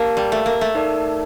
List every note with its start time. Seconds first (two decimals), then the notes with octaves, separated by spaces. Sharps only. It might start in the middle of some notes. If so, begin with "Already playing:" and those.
Already playing: A#3 G4 A#4 F5 A5
0.17 G3
0.32 A3
0.46 A#3
0.61 A3
0.75 D#4 A#4 D5 A5